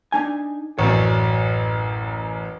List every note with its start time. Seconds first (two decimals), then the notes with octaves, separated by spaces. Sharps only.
0.12 D4 D#4 G#5
0.79 A1 F#2 C#5 D5